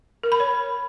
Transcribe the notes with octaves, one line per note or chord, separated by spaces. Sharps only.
A#4
B5
C#5